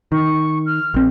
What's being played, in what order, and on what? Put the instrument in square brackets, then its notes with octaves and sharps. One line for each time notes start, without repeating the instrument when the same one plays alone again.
[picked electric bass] D#3 [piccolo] C#6
[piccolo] F6
[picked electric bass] A#1 C4